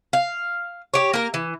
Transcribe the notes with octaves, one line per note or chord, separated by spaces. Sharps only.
F5
G4 C#5
A#3 A#4
E3